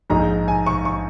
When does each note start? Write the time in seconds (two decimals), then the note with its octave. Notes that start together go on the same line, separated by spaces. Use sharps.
0.10 A#1 G#2 G#3 D#4 A#5
0.48 G#5
0.66 C#6
0.85 C#6